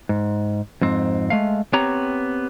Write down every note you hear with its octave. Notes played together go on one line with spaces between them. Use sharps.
G#2
F2 G#2 C4
G#3 A3 F5
B3 C4 G4 C#5 A#5